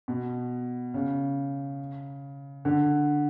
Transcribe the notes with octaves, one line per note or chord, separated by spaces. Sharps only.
B2
C#3
D3